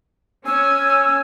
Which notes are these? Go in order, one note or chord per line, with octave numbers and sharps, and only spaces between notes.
C#4 G#5 E6